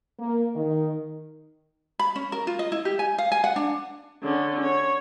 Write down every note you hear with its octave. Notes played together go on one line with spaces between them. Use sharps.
A#3
D#3
B5
C#4
A#4
F4
D#5
E4
G4
G#5
F5
G#5
F#5
D4
D3 C#4
C#5